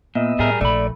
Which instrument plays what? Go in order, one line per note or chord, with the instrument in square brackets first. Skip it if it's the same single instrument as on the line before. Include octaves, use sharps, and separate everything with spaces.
[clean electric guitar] A#2 [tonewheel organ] B3 D#5 E5
[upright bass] A2 [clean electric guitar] G3 G#4 A#4
[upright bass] A#1 [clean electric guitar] A3 B5 [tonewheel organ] D5